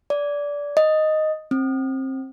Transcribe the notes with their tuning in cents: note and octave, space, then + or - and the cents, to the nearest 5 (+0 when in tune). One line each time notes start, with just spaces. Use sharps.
D5 -20
D#5 +0
C4 +25